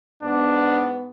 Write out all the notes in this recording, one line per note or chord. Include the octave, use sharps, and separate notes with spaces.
G#2 B3 D4